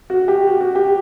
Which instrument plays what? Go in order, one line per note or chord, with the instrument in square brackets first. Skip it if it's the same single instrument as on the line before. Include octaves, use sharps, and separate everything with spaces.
[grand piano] F#4
G4
F#4
F#4
G4